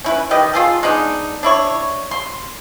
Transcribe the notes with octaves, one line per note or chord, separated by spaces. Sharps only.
C#4 E4 B4
D#3 G4 B4 D#5
F4 G#4 A4
G#3 B3 D4 D#4
D4 E4 C#5
C6